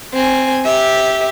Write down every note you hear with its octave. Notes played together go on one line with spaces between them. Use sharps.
C4 G#5
G4 E5